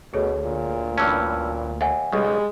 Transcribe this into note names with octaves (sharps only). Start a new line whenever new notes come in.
D2 B2 G#4 A4 C#5
A#2
G2 E3 C#4 A5 E6 F6
D#2 E5 F#5 G#5
B1 C#3 G3 G#3